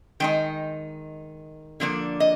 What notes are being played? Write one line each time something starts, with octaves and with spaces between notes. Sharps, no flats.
D#3 G#3 D#4 G5
D3 F3 A#3 D4
D#5